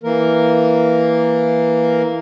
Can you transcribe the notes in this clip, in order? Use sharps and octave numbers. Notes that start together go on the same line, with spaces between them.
E3 A#3 A#4